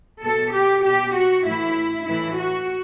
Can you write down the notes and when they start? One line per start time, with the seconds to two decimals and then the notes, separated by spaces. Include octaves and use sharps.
0.22 B2 A4
0.53 G4
0.84 B2 G4
1.14 F#4
1.46 A2 E3 E4
2.07 A2 E3 E4
2.38 F#4